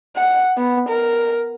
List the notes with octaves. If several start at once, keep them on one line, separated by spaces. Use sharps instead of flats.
F#5
B3
A#4